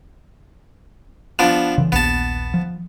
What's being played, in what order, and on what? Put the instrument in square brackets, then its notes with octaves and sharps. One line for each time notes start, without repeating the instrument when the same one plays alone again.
[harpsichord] F3 B3 D4
[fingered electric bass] C#3 E3
[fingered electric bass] A#1 D#2 [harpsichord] B3 A5
[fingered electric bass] F3